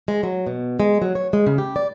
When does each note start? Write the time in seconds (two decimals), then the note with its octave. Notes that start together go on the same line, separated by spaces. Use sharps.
0.08 G#3
0.23 F#3
0.47 B2
0.80 G#3
1.02 F#3
1.15 C#5
1.33 G#3
1.47 C#3
1.58 G4
1.76 D5